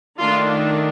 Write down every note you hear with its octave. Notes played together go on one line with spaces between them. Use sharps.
D#3 A3 D4 F4